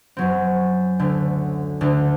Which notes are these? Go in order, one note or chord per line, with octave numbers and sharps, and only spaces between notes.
F#2 F#3 C4
D2 D3 A3
D2 D3 A3